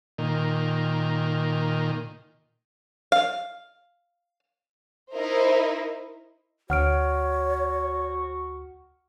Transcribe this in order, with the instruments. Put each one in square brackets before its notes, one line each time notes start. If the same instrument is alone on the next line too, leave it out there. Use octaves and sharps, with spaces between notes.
[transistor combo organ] A#2 D#3
[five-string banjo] F5
[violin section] D#4 E4 A#4 C5 D#5 E5
[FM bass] D2 [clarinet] F#4 [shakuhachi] C#5 [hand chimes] F#5 F6 D7